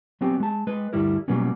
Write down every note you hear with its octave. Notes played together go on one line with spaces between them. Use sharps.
F#3 B3 C4 G4
G#3 A5
G#3 B4
D2 G2 G3 E4 A#4
B2 F#3 G3 A#3 B3 C#4